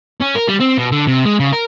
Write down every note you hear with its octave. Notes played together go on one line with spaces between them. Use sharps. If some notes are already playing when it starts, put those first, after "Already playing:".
C#4
A#4
G3
C4
B2
D3
C3
G#3
C#3
A#4